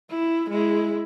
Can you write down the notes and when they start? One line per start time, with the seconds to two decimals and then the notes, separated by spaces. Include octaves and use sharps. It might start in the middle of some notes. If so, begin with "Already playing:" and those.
0.10 E4
0.50 G#3 E4